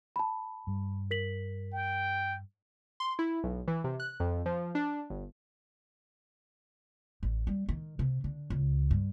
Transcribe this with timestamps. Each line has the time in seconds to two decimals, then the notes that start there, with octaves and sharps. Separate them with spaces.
0.16 A5 B5
0.67 G2 G3
1.11 A#4 B6 F#7
1.73 G5
3.00 C6
3.19 E4
3.44 B1
3.68 E3
3.84 C3
4.00 F#6
4.20 F2
4.46 F3
4.75 D4
5.10 G1
7.23 A1
7.47 G3
7.69 D#3
7.99 C3
8.24 D3
8.50 C#2
8.91 G2